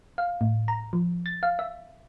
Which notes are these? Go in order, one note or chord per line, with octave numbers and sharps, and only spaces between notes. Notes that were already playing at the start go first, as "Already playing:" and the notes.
F5
A2
A#5
F3
A6
F5
E5